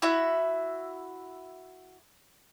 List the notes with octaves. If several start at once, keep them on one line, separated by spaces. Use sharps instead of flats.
E4 F#4 E5